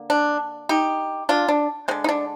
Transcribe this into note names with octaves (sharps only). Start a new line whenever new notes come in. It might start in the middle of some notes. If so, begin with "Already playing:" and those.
Already playing: D3 A#3
D4
D#4 G4
D4 F4
D4
D3 G#3 C4
D#4
D4